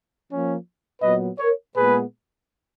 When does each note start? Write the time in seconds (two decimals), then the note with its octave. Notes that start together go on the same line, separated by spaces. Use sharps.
0.29 F3 A#3 C#4
1.02 A#2 F#3 B3 B4 D#5
1.39 A#4 C#5
1.76 A#2 G#3 B3 G#4 B4